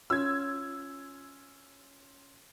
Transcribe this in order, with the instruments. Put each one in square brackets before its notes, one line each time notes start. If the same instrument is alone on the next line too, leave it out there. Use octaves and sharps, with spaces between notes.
[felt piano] C#4 F4 [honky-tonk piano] E6 G#6